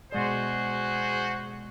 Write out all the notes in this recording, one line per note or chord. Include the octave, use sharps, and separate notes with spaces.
B2 G#3 F#4 G#4 C5 D5